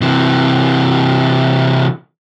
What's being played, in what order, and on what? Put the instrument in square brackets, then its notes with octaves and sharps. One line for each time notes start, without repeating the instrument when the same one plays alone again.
[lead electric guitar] C3 E3